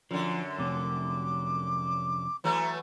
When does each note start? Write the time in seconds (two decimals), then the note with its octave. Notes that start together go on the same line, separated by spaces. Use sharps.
0.11 F#2 D3 F3
0.58 F2 C3 D6
2.44 E3 F#3 A3 A#5